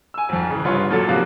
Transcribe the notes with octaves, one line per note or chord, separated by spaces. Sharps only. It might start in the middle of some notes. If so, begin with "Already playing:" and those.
G#5 E6
G#1 F2
C#3 E3
G1 C2 F4 B4 C#5 C6
A#2 F#3 A4 A6
G#1 C3 F3 A#3 F5 F#6